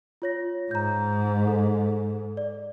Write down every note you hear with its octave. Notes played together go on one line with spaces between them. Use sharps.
F4 C#5 A#6
G#2 A#5 G6
A4
D5